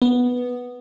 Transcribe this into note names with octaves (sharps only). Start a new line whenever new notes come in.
B3